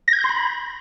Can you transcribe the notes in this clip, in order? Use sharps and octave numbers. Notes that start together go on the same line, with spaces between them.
A#6
G#6
G6
C6
B5